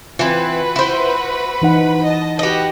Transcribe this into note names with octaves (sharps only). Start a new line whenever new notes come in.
E3 C4 F4 F#4 B4 B5
E4 C5
E3 D#4 F#5
D#5 A5
F#4 G4 B4 D#5